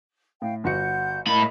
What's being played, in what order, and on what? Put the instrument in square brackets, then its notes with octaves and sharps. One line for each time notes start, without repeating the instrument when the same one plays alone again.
[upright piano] A2 [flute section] F5 G5
[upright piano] G1 F#4 C#7 [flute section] F#5 G6
[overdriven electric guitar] A2 B5 [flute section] A#4 D#5 F5